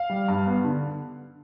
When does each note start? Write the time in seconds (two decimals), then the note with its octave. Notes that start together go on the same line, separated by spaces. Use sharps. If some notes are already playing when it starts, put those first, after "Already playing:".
Already playing: F5
0.10 G3
0.28 G2
0.46 B3
0.64 D3